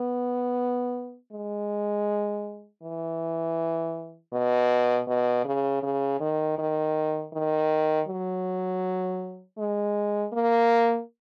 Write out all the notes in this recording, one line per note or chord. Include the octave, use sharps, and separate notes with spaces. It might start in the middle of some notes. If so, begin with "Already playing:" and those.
Already playing: B3
G#3
E3
B2
B2
C#3
C#3
D#3
D#3
D#3
F#3
G#3
A#3